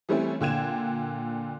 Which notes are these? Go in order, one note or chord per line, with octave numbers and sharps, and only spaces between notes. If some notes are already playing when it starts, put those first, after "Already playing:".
E3 G3 A3 C4 C#4 E4
A#2 D3 G5 G#6 E7